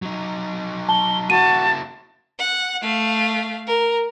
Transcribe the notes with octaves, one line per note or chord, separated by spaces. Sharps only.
F#3 D#4
A5 G7
A#3 E4 F#4 A5 D#7
F#5
A3 F5
A#4